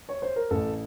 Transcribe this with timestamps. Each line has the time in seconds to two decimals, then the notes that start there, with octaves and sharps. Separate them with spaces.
0.09 C#5
0.22 C5
0.36 A#4
0.50 A1 A4